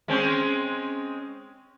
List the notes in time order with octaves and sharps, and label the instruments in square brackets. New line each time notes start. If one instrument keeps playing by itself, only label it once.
[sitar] G#3 C4 C#4